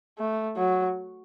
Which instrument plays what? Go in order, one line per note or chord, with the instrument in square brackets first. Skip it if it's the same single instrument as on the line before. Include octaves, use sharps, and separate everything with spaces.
[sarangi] A3
F#3